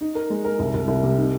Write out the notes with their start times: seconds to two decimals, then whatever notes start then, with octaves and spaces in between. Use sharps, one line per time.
0.01 D#4
0.15 A#4
0.30 G#3
0.44 A#4
0.59 C2
0.74 C2
0.88 C2
1.03 C3
1.18 D#4